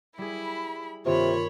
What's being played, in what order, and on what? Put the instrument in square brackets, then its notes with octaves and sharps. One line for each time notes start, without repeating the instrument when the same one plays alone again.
[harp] G3 G#4 [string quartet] E4 B5
[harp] G2 D#3 A#3 [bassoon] C3 [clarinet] F4 [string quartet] C#5 B5